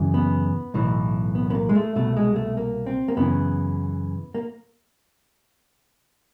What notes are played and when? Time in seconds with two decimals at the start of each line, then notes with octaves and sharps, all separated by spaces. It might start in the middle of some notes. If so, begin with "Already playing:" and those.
Already playing: F#2 C#3 E3
0.14 B3
0.74 B1 A2 E3
1.35 B3
1.50 B3
1.55 A#3
1.69 G#3
1.75 A3
1.95 C2 B2 A3
2.17 G#3
2.36 A3
2.57 A#3
2.86 C4
3.08 A#3
3.17 F#2 C#3 E3 B3
4.35 A#3